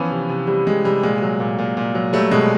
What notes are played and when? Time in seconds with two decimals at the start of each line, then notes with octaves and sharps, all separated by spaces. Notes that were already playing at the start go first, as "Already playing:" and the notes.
Already playing: E3 F3 B3 C#4
0.11 C3
0.29 C3
0.47 C3 G3
0.66 C3 G#3
0.84 C3 G3
1.03 A#2 G#3
1.22 F#3
1.40 A#2
1.59 A#2
1.77 A#2
1.95 F#3
2.13 F#3 G3 A3
2.31 B2 G#3